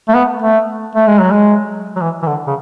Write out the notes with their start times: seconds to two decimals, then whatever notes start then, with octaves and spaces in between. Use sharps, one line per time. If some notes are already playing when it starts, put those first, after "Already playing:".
0.08 A3
0.15 B3
0.42 A3
0.95 A3
1.07 G#3
1.20 F#3
1.32 G#3
1.96 F#3
2.01 E3
2.22 E3
2.27 D3
2.47 C#3